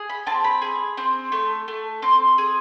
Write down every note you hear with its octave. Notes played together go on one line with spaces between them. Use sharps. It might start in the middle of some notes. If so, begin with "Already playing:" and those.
Already playing: G#4
B5
C4 A5
B5
G#4
C4
A3
A3
C4 C6
G#4